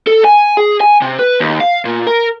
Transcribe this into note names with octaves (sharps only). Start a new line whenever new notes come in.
A4
G#5
G#4
G#5
C3
B4
D#2
F5
A#2
A#4